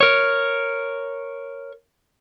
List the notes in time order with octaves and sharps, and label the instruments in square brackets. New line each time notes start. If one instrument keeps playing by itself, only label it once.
[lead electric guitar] A#4 C#5